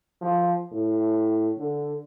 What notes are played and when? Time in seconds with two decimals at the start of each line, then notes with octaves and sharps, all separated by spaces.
0.22 F3
0.72 A2
1.58 D3